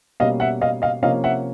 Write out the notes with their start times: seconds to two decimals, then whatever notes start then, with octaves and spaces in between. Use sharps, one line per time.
0.20 B2 G3 A#3 C#4 D#5 F5
0.40 E5 F#5
0.61 D#5 F5
0.82 D#5 F5
1.02 C3 F3 A#3 C#4 D#5 F5
1.24 E5 F#5